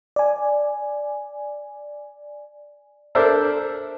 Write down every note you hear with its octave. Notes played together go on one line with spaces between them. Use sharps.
D5 G#5
D4 A4 A#4 C5 D5 E5